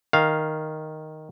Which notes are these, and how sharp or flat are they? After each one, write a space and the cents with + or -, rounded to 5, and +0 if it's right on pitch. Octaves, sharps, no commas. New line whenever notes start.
D#3 +0 F5 +0